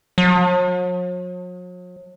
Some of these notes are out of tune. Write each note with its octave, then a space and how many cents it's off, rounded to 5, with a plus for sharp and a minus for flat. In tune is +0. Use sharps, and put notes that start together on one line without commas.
F#3 -45